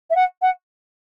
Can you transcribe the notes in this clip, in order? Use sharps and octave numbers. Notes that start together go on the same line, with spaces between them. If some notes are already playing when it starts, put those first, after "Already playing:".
E5
F#5
F#5